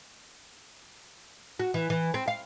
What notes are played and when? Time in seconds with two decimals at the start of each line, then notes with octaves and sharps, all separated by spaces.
1.60 F#4
1.74 E3
1.90 E3
2.14 C4
2.28 F5